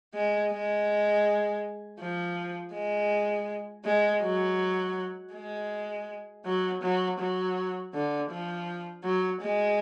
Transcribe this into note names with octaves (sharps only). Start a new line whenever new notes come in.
G#3
G#3
F3
G#3
G#3
F#3
G#3
F#3
F#3
F#3
D3
F3
F#3
G#3